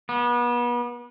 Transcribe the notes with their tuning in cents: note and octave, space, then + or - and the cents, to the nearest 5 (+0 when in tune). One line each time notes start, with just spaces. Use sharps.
B3 -35